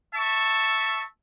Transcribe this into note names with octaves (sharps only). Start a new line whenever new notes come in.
E5 A5 C#6